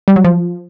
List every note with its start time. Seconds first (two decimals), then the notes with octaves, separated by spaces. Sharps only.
0.08 G3
0.16 F#3
0.25 F3